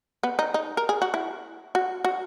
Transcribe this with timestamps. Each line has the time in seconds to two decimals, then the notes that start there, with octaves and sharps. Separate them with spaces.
0.23 B3
0.39 D#4
0.54 D#4
0.77 A#4
0.89 G#4
1.02 F#4
1.14 E4
1.75 F#4
2.05 F#4